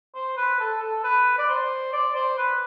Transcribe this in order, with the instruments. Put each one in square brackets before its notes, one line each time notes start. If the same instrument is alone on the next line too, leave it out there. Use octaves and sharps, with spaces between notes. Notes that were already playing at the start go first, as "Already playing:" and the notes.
[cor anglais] C5
B4
A4
A4
B4
D5
C5
D5
C5
B4